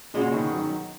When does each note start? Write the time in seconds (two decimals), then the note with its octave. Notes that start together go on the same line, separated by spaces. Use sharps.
0.14 A#2 C#3 G#3 C#4 F#4
0.34 B2 D#3
0.53 D#3 F#3